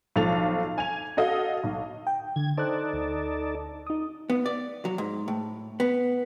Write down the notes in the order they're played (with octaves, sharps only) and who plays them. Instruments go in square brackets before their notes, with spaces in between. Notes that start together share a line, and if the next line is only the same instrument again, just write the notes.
[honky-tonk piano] B1 F3 A4 A6 F7
G#5 G#6 F7
F#4 A4 D#5 F5
B1
[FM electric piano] G5
[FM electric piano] D3 [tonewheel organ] G#6
[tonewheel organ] D#4 A4 D5 [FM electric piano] C5 F#6
[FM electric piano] D2
D#4 D#6
[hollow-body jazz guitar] B3
D5
F#3
G#2
A2
B3